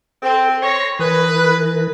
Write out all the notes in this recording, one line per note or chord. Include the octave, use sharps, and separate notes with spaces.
C4 A4
C#5 C6 A#6
E3 G#4 A#4 B4